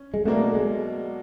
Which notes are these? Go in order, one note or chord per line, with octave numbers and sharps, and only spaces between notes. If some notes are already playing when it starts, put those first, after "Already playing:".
Already playing: C#4
G#3
B2 F#3 A3 A#3 D4
G#3